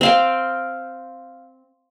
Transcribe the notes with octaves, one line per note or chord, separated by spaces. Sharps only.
C4 F5 G5